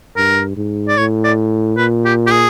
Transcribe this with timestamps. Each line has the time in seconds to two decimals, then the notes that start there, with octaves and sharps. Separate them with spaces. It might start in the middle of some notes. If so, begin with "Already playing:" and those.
0.17 G2 A#4
0.57 G#2
0.88 D5
0.97 A2 C#5
1.24 D5
1.77 A#2 B4
2.05 G4
2.27 G4
2.31 G#4